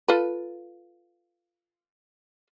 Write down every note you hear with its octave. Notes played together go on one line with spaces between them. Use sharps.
F4 A4 B4